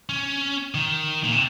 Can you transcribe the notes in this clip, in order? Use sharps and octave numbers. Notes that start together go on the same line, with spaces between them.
C#4
D#3
A#2
C3